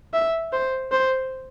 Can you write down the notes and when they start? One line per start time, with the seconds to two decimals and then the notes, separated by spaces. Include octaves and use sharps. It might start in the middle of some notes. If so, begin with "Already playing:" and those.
0.14 E5
0.53 C5
0.92 C5